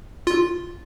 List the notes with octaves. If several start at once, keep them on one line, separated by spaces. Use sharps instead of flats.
F4